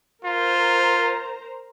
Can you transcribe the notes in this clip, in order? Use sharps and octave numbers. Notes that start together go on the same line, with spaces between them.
F4 A#4 C5 A#5